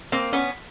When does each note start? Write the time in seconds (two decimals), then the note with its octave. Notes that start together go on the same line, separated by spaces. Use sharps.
0.12 A#3 C4
0.33 B3 C#4